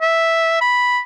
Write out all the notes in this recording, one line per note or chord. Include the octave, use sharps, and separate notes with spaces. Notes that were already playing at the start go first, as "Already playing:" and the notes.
E5
B5